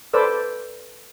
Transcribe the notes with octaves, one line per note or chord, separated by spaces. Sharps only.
A4 B4 C5 D5 E6